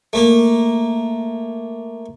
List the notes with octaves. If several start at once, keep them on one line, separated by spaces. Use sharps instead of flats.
A3 A#3